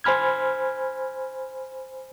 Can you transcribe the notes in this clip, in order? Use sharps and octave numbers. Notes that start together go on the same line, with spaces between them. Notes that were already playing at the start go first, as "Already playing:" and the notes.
C5 G#5 B5 F6 G#6